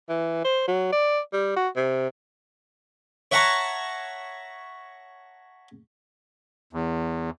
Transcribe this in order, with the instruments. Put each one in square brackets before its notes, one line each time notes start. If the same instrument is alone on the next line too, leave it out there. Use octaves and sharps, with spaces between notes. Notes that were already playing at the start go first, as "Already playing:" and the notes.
[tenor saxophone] E3
C5
F#3
D5
G3
F#4
C3
[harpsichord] C#5 E5 F#5 A5 A#5 C#6
[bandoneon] E2